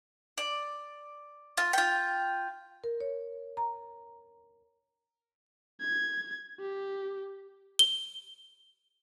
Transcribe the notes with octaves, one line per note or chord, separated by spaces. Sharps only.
D5
F4
F4 G5
A#4
C#5
A#5
G#6
G4
G7